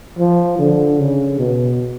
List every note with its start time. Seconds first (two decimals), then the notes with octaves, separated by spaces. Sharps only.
0.19 F3
0.59 D3
0.99 C#3
1.39 B2